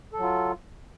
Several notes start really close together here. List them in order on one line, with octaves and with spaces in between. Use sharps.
A4 F#3 F4